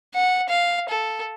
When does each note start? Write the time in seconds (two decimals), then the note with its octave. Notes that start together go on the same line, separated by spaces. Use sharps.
0.15 F#5
0.49 F5
0.89 A4